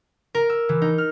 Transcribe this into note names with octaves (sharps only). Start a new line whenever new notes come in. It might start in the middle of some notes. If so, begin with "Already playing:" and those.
A#4
E6
E3
D#4
F6